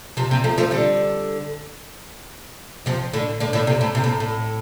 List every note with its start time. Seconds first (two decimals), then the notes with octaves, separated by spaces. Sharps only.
0.17 C3 F3
0.31 C3
0.44 F3 A3
0.58 F3 A3
0.71 D3 G3
2.86 C3 F3
3.13 A2 D3
3.40 A2 D3
3.53 A2 D3
3.67 C3
3.81 A2
3.95 C3
4.04 A2
4.20 A2